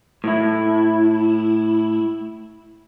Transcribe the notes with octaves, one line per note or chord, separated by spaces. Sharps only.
A2 E4